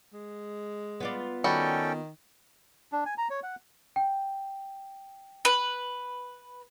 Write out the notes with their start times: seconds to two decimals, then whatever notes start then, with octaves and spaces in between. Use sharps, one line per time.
0.14 G#3
1.00 B3 F4 D5
1.44 D#3 G3 C#4 F#4 A4 G5
2.92 D4
3.06 G#5
3.18 A#5
3.30 C#5
3.43 F#5
3.96 G5
5.45 B4